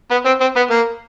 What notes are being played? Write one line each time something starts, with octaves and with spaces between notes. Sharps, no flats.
B3
C4
C4
B3
A#3